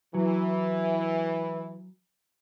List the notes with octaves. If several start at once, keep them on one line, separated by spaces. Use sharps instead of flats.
E3 F#3